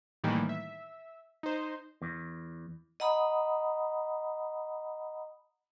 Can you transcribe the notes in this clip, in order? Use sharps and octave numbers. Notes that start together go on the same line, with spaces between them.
A2 D#3 E3 G3 A#3
E5
D#4 C5
E2
D#5 F#5 A#5 B5 D#6